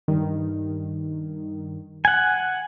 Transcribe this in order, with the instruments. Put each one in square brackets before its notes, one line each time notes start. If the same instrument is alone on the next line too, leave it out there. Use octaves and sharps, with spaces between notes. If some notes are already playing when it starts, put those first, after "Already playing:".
[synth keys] G2 D#3
[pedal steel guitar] F#5 G#5